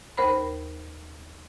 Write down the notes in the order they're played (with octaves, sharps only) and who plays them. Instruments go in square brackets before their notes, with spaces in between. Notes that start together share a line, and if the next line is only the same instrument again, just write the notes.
[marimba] D#2 A#4 C5 B5